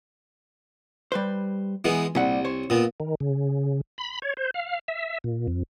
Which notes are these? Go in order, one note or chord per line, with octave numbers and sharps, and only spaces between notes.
G3 B4 C5
E3 G#3 B3
C2 A#2 G3 F#5
C5 C#5
A#2 B3
D#3
C#3
B5
C#5
C5
F5
E5
A#2
F2